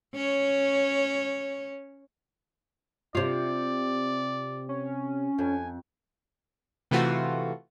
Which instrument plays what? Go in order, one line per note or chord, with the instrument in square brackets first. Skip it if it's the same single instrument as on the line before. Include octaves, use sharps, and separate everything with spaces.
[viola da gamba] C#4 C#5
[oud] C3 F4 [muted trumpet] D5
[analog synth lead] C#4
[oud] F2 [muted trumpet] G#5
[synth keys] C3 E3 A3 F4 F#4